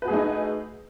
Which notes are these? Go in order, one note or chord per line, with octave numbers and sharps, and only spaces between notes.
A3 D#4 F#4 G#4 B4